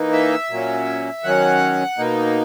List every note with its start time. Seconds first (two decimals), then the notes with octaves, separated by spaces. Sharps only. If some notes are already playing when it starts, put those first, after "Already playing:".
Already playing: E3 A#3 D#4
0.13 E5
0.50 A#2 F#3 A#3 C#4
1.24 D#3 F#3 C#4 F#5
1.98 B2 A#3 D#4